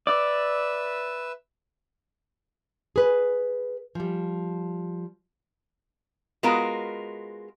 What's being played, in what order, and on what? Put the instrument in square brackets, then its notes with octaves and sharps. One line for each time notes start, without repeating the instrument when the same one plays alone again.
[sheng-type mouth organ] B4 E5 E6 [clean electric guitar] D5
[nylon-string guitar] G#4 B4
F3 G3
[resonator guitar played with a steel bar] G#3 B3 F4 F#4 A#4